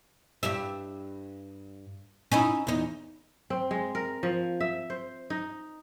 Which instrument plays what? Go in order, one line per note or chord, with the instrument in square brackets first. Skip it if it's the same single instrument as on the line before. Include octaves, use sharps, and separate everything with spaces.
[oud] G2 G4 E5
C#4 D#4 E4
E2 D#4
[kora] C4
G#3
A#4
F3
E5
C5
D#4